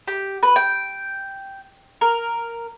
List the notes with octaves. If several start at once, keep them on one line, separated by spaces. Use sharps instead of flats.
G4
B4
G5
A#4